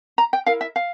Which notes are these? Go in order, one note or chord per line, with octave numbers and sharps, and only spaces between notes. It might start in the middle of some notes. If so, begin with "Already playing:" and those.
A#5
G5
E4 A#4 F5
E5
F5